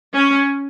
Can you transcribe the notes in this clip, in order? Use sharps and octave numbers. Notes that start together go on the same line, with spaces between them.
C#4